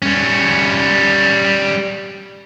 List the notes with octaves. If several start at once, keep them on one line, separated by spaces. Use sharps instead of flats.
G3 C#4